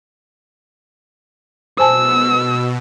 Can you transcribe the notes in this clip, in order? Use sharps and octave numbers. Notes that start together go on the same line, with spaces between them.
B2 C5 G#5 A5 E6